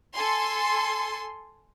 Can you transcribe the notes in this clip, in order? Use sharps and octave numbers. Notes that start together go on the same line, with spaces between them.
A4 G#5 C6